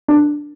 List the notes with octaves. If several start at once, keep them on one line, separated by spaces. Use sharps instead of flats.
D4